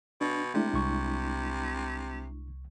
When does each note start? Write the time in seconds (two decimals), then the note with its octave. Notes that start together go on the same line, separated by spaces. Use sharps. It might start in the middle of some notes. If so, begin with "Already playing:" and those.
0.21 B2 D4
0.54 C3 G#3 A3 D4 E4
0.74 C2 C#6